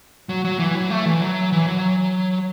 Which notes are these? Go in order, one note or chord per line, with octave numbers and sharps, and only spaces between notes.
F#3
F#3
E3
F#3
A3
E3
F#3
E3
F#3